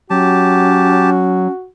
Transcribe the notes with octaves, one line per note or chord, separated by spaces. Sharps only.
F#3 C#4 F#4 G4 A5